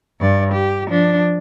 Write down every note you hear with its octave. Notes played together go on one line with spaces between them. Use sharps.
G2 D5
G4
F3 D4